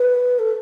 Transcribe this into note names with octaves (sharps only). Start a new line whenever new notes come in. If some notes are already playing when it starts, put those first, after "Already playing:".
Already playing: B4
A4